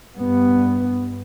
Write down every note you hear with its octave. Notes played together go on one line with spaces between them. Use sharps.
G2 B3